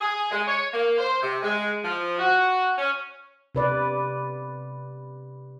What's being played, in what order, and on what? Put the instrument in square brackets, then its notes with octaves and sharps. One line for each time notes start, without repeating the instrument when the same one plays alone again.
[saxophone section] G#4
G#3
C#5
A#3
C5
C3
G#3
F3
F#4
C#4
[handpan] C3 B4 D5